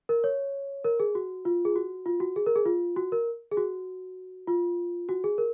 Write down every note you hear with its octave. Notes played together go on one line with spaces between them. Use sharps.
A#4
C#5
A#4
G#4
F#4
F4
G#4
F#4
F4
F#4
G#4
A#4
G#4
F4
F#4
A#4
G#4
F#4
F4
F#4
G#4
A#4